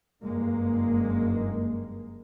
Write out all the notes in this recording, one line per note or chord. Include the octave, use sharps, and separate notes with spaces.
F#1 G2 G#3 A#3